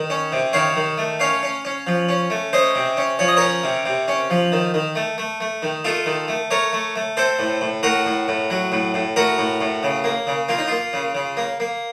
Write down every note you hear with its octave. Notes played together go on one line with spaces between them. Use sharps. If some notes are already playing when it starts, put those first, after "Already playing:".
Already playing: D#3
C#4
C3
D#3 C#5 F5
D#3
A3
C#4 C#5 F5
C#4
C#4
F3
C#4
A3
C#4 C5 D#5
C3
C#4
F3 C#5
D#5
C#4 A#4 C#5
C3
C3
C#4
F3
D#3
D#3
A3
A3
A3
D#3
A3 F4 A4
D#3
A3
A3 A#4 C#5
A3
A3
C4 A4 C5
A2
A2
A2 F#4 A#4
A2
A2
F#3
A2
A2
A2 F#4 A#4
A2
A2
C#3
A#3
C#3
A#3 F4
D#4
A#3 F4
C#3
C#3
A#3
A#3